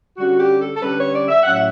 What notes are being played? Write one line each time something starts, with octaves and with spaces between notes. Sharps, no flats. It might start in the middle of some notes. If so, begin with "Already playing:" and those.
D3 G3 C#4 F#4
G4
A4
A4
D3 G3 C#4 B4
C#5
D5
E5
A2 F#3 C#4 F#5
E5